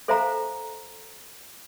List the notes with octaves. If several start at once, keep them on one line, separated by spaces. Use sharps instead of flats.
A4 C5 E5 F5 G#5 A#5